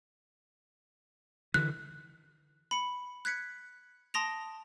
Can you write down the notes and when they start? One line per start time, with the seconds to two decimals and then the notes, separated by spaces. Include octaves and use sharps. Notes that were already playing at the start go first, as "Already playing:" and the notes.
1.54 D3 E3 F#6
2.71 B5 C#7
3.25 F#6 G#6 B6 C#7
4.14 A5 C6 D#6 A#6 D7 F7